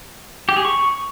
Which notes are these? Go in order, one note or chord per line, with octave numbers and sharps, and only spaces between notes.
G4
G#4
C#6